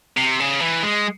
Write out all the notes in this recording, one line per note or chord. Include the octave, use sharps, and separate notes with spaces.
C3
C#3
E3
G#3